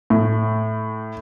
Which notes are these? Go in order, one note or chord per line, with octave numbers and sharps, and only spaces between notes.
A2